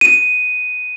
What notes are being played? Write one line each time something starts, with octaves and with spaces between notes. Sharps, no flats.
D#7